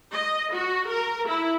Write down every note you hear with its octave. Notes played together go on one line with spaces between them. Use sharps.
D#5
F#4
A#4
E4